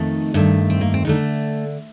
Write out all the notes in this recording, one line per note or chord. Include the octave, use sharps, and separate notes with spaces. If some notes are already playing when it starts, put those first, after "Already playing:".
Already playing: F2 D#3 A3 D#4
G2 D#3 A3
C4
A#3
C4
D3 A3 D#4